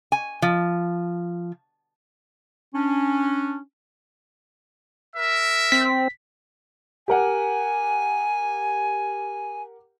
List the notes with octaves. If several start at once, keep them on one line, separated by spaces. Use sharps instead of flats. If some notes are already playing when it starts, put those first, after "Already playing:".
G#5
F3
C#4 D4
A#4 E5
C4 B6
G4 A#4 F#5 G#5